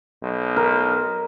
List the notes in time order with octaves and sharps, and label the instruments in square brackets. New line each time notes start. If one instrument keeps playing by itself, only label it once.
[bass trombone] B1
[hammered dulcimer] A#4